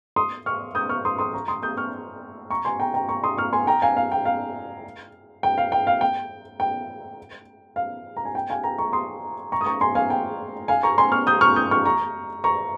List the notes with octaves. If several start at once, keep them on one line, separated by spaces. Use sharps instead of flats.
C6 D#6
C#6 F6
D#6 G6
C#6 F6
C6 D#6
C6 D#6
A#5 C#6
C6 D#6
D#6 G6
C#6 F6
A#5 C#6
G#5 C6
G5 A#5
G5 A#5
A#5 C#6
C6 D#6
C#6 F6
G#5 C6
G5 A#5
F5 G#5
F5
G5
F5
G5
F5
G5
F5
G5
G5
F5
A#5
G#5
G5
F5 G#5
G5 A#5
A#5 C#6
C6 D#6
A#5 C#6
D#6
A#5 C#6
G#5 C6
F5 G#5
G5
F5 G#5
A#5 C#6
G#5 C6
C#6 F6
D#6 G6
C#6 F6
D#6 G6
C#6 F6
A#5 C#6
A#5 C#6